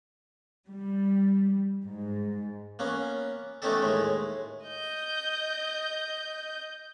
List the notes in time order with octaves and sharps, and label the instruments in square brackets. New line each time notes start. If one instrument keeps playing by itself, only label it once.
[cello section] G3
G#2
[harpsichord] A#3 B3 C#4
A3 B3 C#4 D#4 G4 A4
D#2 A2 G#3
[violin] D#5 G6